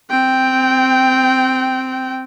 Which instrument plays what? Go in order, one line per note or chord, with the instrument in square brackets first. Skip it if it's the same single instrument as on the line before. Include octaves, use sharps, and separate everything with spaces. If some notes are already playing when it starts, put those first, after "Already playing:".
[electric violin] C4 G5